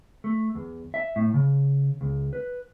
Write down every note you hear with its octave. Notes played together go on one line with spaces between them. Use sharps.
A3
E2
E5
A2
C#3
C#2
B4